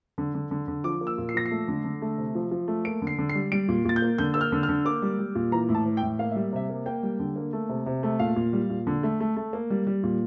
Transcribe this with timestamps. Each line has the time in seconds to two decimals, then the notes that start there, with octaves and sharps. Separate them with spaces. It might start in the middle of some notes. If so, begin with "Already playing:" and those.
0.18 D3
0.34 D3
0.51 D3
0.68 D3
0.84 F3 D6
1.01 A#3
1.07 E6
1.18 A#2
1.29 C7
1.34 F3 A#6
1.46 C7
1.51 A3
1.68 D3
1.85 D3
2.02 A3
2.18 C3
2.35 F3
2.51 F3
2.68 A3
2.85 A#3 D7
3.02 D3
3.07 C7
3.18 D3
3.29 C7
3.35 G3
3.52 G3 D7
3.69 A#2
3.85 A#2 A6
3.96 G6
4.02 A#3
4.18 D3 G6
4.34 A#3 E6
4.41 F6
4.52 D3
4.63 F6
4.69 D3
4.85 A#3 D6
5.02 G3
5.19 G3
5.35 A#2
5.52 E3 A#5
5.69 A2
5.75 A5
5.86 E3
5.97 G5
6.02 A2
6.19 A#3 F5
6.31 G3 E5
6.52 C3 E5
6.69 A#3
6.86 A#3 G5
7.03 G3
7.19 D3
7.36 A#3
7.53 A3
7.69 C3
7.86 C3
8.03 A3
8.19 A#2 F5
8.36 A#2
8.53 G3
8.70 A#2
8.87 D3
9.03 A3
9.20 A3
9.37 A3
9.53 A#3
9.70 G3
9.87 G3
10.03 A#2